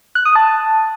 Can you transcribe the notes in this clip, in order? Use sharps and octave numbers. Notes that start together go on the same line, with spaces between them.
F#6
D#6
A5